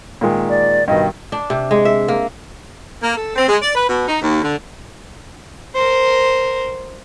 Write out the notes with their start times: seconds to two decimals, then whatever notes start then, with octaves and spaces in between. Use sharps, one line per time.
0.21 A#2 D#3 G#3
0.49 D5
0.88 G2 B2 D#3 D#5
1.32 D4
1.50 C3
1.71 G#3
1.85 E5
2.08 A#3
3.02 A#3
3.16 A4
3.36 C4
3.48 G#3
3.62 D5
3.75 B4
3.89 B2
4.07 D#4
4.21 D#2
4.42 D3
5.74 A#4 C5